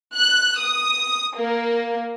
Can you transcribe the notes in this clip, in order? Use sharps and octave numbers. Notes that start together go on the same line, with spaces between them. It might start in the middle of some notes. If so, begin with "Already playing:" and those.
F#6
D#6
A#3